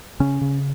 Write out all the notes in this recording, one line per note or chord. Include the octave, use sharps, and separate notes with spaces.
C#3 C#4
C#3